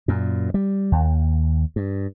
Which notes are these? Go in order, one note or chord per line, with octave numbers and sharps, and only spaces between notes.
F#2 A#2
G3
D#2
G2